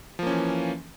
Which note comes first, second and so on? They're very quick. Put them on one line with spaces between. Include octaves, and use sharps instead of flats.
F3 A#3 C#4 E3